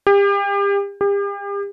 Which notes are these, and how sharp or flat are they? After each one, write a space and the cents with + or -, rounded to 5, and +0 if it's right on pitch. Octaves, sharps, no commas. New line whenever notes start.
G4 +35
G4 +40